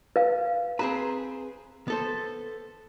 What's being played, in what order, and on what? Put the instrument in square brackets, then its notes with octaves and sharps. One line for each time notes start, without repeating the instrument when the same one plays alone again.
[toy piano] B4 F5
[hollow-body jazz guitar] C4 G#4 B4 [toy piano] A#5
[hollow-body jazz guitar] B3 A4 C5